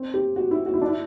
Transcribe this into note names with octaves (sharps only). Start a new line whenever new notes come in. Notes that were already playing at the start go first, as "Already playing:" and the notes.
Already playing: C4
G4
F#4
E4
F#4
E4
D4
E4